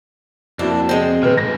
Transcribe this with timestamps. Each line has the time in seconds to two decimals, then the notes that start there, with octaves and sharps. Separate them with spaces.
0.59 F2 A#3 D4 E4 F#4
0.89 G#3 C4
1.23 D#1 C3 B4 F6
1.37 C#2 G#2 A#6